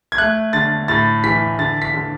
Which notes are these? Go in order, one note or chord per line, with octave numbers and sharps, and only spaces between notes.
G#6
A3 F#6
D3 A6
A2 A6
E3 B6
D3 A6
B6
D3